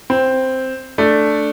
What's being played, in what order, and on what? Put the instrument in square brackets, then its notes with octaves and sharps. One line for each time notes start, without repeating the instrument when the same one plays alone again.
[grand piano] C4
A3 D4